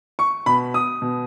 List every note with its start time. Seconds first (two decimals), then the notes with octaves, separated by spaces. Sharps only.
0.19 C#6
0.46 B2 B5
0.74 D#6
1.02 B2